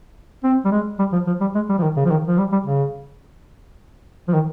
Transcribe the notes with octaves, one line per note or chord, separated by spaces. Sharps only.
C4
G3
G#3
G3
F3
F3
G3
G#3
G3
F3
D#3
C#3
F3
D#3
F3
G3
G3
C#3
F3
D#3